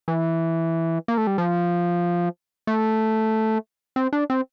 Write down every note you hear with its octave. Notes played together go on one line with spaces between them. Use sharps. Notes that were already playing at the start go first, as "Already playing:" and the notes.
E3
A#3
A3
G3
F3
A3
C4
D4
C4